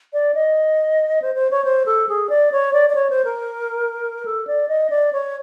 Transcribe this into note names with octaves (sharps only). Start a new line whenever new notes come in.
D5
D#5
C5
C5
C#5
C5
A4
G#4
D5
C#5
D5
D5
C#5
C5
A#4
A4
D5
D#5
D5
C#5